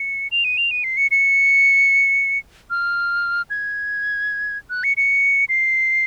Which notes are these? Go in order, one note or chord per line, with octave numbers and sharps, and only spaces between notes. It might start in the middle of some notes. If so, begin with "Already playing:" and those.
Already playing: C#7
F7
D#7
F7
D#7
C7
C#7
C#7
F6
G#6
F#6
C#7
C#7
C7